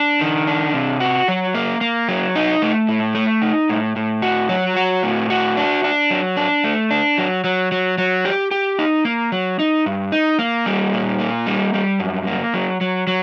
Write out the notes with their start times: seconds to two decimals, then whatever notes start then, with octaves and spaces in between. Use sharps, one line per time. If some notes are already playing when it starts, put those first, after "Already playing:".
Already playing: D4
0.21 D#3
0.47 D4
0.74 C3
1.00 F#4
1.28 F#3
1.55 A#3
1.81 A#3
2.08 F#3
2.35 D#4
2.62 A3
2.89 A2
3.15 A3
3.42 D#4
3.69 A2
3.96 A2
4.22 F#4
4.49 F#3
4.76 F#4
5.03 A2
5.30 F#4
5.57 D4
5.84 D4
6.11 F#3
6.37 D4
6.64 A3
6.91 D4
7.18 F#3
7.44 F#3
7.72 F#3
7.98 F#3
8.25 G4
8.51 G4
8.79 D#4
9.05 A#3
9.32 F#3
9.59 D#4
9.86 G2
10.12 D#4
10.39 A#3
10.66 G3
10.93 A#2
11.20 A#3
11.47 G3
11.74 G3
12.00 F#2
12.27 A#3
12.54 F#3
12.81 F#3
13.07 F#3